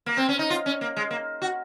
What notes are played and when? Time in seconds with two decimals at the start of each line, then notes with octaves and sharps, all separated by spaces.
0.06 A#3
0.17 C4
0.29 C#4
0.39 D#4
0.50 F4
0.66 C#4
0.81 A#3
0.96 G#3
1.11 A#3
1.42 F#4